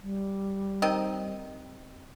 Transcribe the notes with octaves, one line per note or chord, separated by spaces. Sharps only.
G3
D#3 C4 D#5